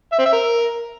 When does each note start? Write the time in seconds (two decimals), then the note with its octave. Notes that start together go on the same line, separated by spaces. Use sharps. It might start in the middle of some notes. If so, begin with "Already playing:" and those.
0.12 E5
0.19 C4
0.26 E5
0.33 A#4